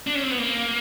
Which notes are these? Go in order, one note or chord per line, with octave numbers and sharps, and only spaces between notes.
D4
C#4
C4
B3
A#3